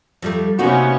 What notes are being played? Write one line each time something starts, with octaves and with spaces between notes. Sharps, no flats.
F2 G3 A3
C3 A#3 B3 C#4 D#4 F#4